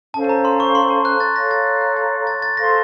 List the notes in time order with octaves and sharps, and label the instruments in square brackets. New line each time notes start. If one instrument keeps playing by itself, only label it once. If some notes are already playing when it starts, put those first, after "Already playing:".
[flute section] C#4 A4 C5 F5 [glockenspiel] A5
[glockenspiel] A5
A#5
C6
C#6
C6
A5
F#6
A6
[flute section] A4 C#5 F5 A#5 [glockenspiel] A#6
[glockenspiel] A6
F#6
F#6
A6
A6
A6
[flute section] A4 C5 F5 C6 [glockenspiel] A#6